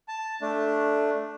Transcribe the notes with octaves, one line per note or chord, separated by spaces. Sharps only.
A5
A3 D4